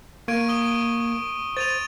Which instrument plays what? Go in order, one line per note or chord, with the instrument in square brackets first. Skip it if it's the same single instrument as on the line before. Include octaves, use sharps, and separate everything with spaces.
[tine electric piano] A#3 G#6 [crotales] C#6 D7 D#7
[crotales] D#6 G7
[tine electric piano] C5 [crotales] A6 D#7 F7